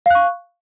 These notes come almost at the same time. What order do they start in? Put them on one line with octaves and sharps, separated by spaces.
F5 F#6 C#6